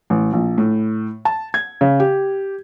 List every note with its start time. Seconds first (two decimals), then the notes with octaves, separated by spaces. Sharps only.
0.10 A1
0.33 A#1
0.58 A2
1.25 A5
1.54 G#6
1.81 C#3
2.00 G4